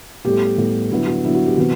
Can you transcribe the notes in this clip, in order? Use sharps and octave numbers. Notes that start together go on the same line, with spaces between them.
A2 G3 B3 G4
A2 G3 B3
D3 F#3 B3 E4
F#4
D3 F#3 B3 E4
F#4
G4
C3 E3 B3 F#4